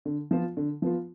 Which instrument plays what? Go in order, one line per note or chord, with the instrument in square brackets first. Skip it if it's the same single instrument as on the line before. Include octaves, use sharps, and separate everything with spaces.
[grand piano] D3
F3 B3 F4
D3
F3 B3 F4